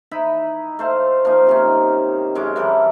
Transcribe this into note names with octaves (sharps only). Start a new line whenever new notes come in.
D#4 E4 B5
A3 C5 F5
F3 A#3 D#4
C3 D#3 C#4
F#2 G#3 C#4 D6
E3 G3 A4 A#4